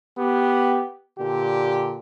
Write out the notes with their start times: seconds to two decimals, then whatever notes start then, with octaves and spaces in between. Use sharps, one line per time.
0.17 B3 G4
1.18 A#2 D3 G4